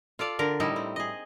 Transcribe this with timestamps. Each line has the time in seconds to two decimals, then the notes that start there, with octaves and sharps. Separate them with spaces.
0.19 F4 A4 D5 F5
0.39 D3 A#4
0.60 A2 G3 D#4 E4 D#5
0.76 C4
0.96 G#4 D#5